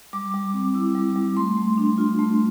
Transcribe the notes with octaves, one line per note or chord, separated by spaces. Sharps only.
G3 D6
G3
C4
E4
G3
G3
A3 C6
A3
D4
F4
A3